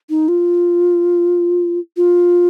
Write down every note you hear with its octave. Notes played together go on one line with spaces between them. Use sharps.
D#4
F4
F4